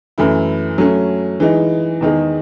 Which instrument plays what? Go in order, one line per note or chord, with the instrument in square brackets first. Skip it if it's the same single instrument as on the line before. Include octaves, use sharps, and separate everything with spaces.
[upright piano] F#2 E3 A3 E4
F#3 A3 C#4
E3 G#3 D#4
E2 D#3 G#3 D#4 G#4